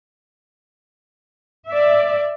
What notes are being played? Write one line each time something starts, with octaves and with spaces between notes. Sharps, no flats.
D5 E5